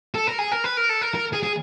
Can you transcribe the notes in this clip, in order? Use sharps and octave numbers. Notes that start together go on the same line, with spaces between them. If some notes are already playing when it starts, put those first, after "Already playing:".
A4
A#4
G#4
A#4
B4
A#4
A4
A#4
A#4
G#4
G#4